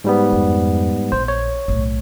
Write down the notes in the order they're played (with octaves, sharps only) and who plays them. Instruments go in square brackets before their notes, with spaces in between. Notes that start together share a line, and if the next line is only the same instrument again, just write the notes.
[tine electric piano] G#2 G3 B3
[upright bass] F2
[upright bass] A#1 [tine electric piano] C5
[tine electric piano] C#5
[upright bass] B1 A2